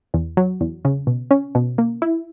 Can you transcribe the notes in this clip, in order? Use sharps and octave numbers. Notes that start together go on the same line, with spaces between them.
E2
F#3
E2
C#3
B2
C#4
B2
A#3
E4